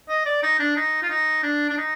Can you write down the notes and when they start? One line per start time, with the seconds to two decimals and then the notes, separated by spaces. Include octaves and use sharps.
0.09 D#5
0.26 D5
0.42 D#4
0.59 D4
0.76 D#4
1.02 F4
1.10 D#4
1.43 D4
1.70 D4
1.78 D#4